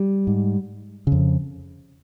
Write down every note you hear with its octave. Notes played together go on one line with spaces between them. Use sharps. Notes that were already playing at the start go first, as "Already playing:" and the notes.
Already playing: G3
G#2
F2 C#3